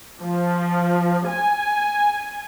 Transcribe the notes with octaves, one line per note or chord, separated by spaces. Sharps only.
F3
G#5